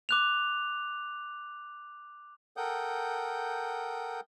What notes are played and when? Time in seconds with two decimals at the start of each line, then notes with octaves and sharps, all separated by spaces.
0.09 D6 F#6 F7
2.57 A4 A#4 F#5 G5 D#6 G6